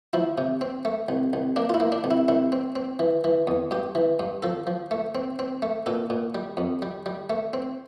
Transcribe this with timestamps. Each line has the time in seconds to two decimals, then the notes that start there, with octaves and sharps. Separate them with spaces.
0.13 F3 E4
0.38 C3
0.61 C4
0.85 A3
1.09 C2
1.33 C2
1.56 A#3 D4
1.69 F4
1.74 E4
1.80 A#3
1.92 D4
2.04 C2
2.11 E4
2.28 C2 E4
2.52 C4
2.76 C4
2.99 E3
3.24 E3
3.47 E2
3.71 G2 G4
3.95 E3
4.19 G2
4.43 F3 A4
4.67 F3
4.91 A3
5.15 C4
5.39 C4
5.62 A3
5.86 A#2 A4
6.10 A#2
6.35 G3
6.57 F2
6.82 G3
7.06 G3
7.30 A3
7.53 C4